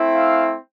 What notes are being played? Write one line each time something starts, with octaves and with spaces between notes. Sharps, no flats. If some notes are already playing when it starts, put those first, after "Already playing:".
Already playing: A3 C4 E4
F5